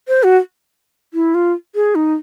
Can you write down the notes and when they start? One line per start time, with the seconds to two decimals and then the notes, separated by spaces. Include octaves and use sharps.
0.08 C5
0.23 F#4
1.14 E4
1.35 F4
1.75 G#4
1.95 D#4